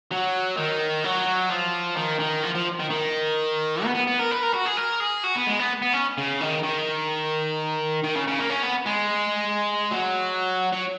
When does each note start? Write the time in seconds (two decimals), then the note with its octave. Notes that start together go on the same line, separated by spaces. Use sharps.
0.11 F#3
0.57 D#3
1.04 F#3
1.50 F3
1.97 D#3
2.20 D#3
2.44 F3
2.55 F3
2.79 D#3
2.90 D#3
3.84 B3
3.95 B3
4.07 B3
4.19 A#4
4.31 B4
4.43 A#4
4.54 F#4
4.66 G#4
4.77 A#4
5.00 G#4
5.24 F#4
5.36 B3
5.47 G#3
5.59 B3
5.82 B3
5.93 C#4
6.18 C#3
6.41 D#3
6.63 D#3
8.04 D#3
8.15 C#3
8.27 C#3
8.39 A#3
8.50 C#4
8.63 B3
8.86 G#3
9.91 F#3
10.72 F#3